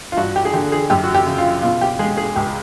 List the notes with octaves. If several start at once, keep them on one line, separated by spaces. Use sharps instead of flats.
F4
G2 F#4
G4
G#4
D3 G4
G#4
F#2 G4
F#4
G4
C#3
F4
B2 F4
G4
G#3 G#4
G#4
C#2 G4